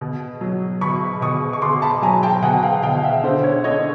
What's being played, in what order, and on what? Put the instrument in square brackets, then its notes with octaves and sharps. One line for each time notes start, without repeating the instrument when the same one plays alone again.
[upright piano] B2
F#3
B2 B5 C#6
B2 C#6 D#6
C#6
B2 C6 D6
A5 B5
F#3 G#5 A#5
G5 A5
B2 F#5 G#5
F5 G5
B2 F5 G5
E5 F#5
D3 C5
C#5
D3 C#5 D#5